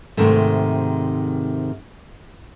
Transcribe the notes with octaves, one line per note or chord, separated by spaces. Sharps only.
G#2 C3 D#3 A3